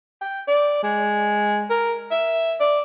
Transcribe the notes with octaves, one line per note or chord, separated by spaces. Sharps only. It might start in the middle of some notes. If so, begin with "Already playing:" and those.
G5
D5
G#3
A#4
E5
D5